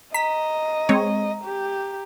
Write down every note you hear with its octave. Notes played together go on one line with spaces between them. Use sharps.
D#5 A#5 B6
G#3 C4 C#5
G4